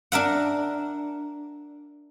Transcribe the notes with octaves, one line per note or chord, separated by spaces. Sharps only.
D4 A#4 E5 F#5